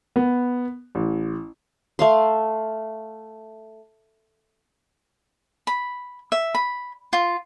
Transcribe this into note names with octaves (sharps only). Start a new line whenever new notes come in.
B3
A1
A3 F5 C6
B5
E5
B5
F4